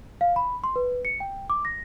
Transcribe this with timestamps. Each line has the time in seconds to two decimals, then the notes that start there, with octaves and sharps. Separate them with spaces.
0.21 F5
0.36 B5
0.64 C6
0.76 B4
1.05 C#7
1.20 G5
1.50 D6
1.65 A#6